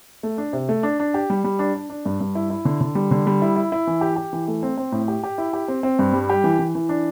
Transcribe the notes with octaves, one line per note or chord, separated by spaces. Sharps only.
A3
D4
C3
A3
D4
D4
G4
G3
G3
D4
D4
D4
G2
G2
E4
E4
D3
D3
G3
D3
G3
E4
E4
E4
E3
G4
G4
E3
A3
C4
C4
A2
G4
G4
E4
G4
C4
C4
G2
G3
G4
E3
E3
E3
D4